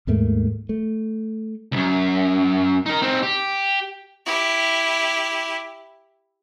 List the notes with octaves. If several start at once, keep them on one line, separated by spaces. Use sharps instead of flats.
D#2 G#2 A3 A#3
A3
C#2 F#2
D#4 A#4
C4 D#4
G4
E4 G4